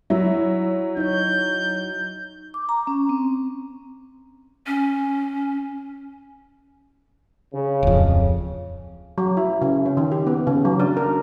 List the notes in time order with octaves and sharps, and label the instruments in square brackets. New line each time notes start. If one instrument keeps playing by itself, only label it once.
[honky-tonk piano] F#3 [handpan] E4 E5
[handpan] D#4 C#5 [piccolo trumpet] G6
[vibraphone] D6
A#5
C#4
C4
[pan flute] C#4
[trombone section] C#3
[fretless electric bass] D1 F2
[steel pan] F#3
E4
C#3
C#4
D#3
G4
B3
C#3
F#3
D4
A#4